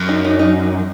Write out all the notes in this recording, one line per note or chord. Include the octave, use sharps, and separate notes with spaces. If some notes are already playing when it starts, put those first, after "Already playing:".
Already playing: F#2
D#4
D#4
D#4